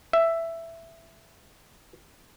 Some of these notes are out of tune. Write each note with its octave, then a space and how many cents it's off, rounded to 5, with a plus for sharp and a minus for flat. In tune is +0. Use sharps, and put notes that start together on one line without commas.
E5 +10